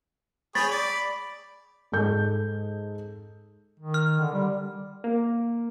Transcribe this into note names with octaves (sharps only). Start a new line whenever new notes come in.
G#4 C#5 G5 B5 A6
D5
G#2 A4 G6
D#3
F6
D3
G3
A#3